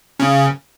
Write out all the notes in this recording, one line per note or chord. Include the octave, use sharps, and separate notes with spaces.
C#3